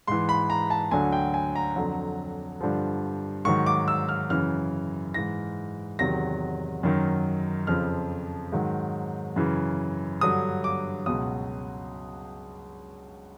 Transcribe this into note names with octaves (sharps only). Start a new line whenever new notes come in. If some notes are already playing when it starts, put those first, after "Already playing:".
G#2 E3 C6
B5
A#5
A5
D2 D3 F#3 G#5
G5
G#5
A#5
F2 D3 F#3
G2 D3 F3
G#2 D#3 F#3 C#6
D6
E6
F6
F#2 C#3 E3 F6
G#2 E3 A#6
E2 C3 D#3 F#3 A#6
F#2 D#3 F#3
F2 C#3 F3 F6
G#2 D#3 F#3
F#2 C#3 E3
G2 D3 F#3 D#6
D6
C#2 B2 F#3 D#6